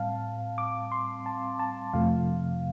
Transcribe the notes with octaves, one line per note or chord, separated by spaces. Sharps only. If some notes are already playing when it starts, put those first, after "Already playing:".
Already playing: A2 G3 C4 F5 A5
D6
C6
A5
A5
F2 C3 F3 A3 F5